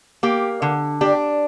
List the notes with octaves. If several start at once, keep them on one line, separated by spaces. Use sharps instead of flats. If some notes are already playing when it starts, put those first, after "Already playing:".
A#3 G4
D3
D4 G4